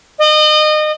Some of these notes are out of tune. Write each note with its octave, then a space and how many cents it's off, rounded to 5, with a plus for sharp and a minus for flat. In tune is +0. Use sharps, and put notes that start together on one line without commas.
D#5 -30